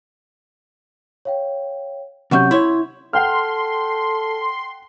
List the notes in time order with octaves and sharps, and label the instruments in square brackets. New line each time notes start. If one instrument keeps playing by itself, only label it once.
[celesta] C#5 F5 G5
[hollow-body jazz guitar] C3 F#3 C#4 [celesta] F#5 C#6 G6
[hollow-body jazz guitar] E4 C#5 [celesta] C6
[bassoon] A4 [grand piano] F#5 G5 F6 [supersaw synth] C6